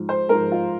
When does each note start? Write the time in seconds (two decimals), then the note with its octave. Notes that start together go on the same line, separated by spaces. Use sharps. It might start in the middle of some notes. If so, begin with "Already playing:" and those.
Already playing: G#2 F3
0.09 C5
0.29 G#2 F3 A#4
0.52 F4